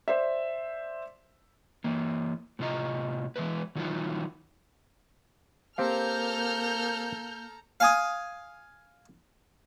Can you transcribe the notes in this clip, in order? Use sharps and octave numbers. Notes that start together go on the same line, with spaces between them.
C5 D5 E5
E3 A#3
A2 C3 A3 F4 D#5 A#5
E3 G3 G#3 E4 B4
D#3 E3 F#3 D#4 F4 F#4
A#3 C4 G4 A4 F5 A#5 F6 G6
F5 G#5 D#6